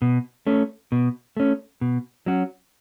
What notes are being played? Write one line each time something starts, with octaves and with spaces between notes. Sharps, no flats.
B2
A3 C#4
B2
A3 C#4
B2
F#3 C#4 F#4